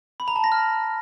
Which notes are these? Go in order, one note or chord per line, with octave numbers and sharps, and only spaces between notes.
B5
A#5
A5
A#6
F6